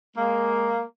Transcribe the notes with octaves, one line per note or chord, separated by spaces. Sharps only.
G#3 A#3